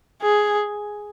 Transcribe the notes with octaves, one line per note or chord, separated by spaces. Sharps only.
G#4